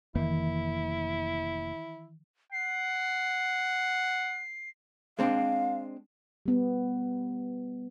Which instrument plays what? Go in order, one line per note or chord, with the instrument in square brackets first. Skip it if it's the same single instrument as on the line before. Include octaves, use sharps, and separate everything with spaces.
[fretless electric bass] F1 F2 A#3 [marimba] D#3 E3 [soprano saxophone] E4
[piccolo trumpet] F#5 [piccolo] C7
[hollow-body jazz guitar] G#3 C4 D4 [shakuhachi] F5
[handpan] G3 B3